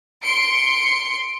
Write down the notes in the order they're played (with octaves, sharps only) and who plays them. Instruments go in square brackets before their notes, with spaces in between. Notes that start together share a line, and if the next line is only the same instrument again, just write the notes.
[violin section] C6 C#7 D7